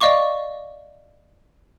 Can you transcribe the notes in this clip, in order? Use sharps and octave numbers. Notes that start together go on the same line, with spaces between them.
D5 D#5 F5 C#6 D6